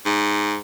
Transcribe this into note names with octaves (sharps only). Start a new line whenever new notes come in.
G#2